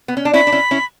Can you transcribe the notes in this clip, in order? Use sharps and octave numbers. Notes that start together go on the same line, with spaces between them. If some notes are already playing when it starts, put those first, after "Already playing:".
B3
C#4
D4
C#4 E4 B5
D4
C#4 E4
C#4 E4